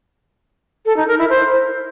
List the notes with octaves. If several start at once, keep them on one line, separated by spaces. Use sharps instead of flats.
A4
D#4
A#4
E4
C5